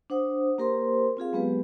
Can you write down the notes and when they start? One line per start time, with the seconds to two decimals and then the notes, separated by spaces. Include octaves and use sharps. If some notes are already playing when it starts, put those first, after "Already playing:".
0.10 D4 C5 F#5 D#6
0.58 A#3 G4 A#4 C5 C6
1.17 C4 F4 G#4 F5
1.32 F#3 G#3 B3 G4 B4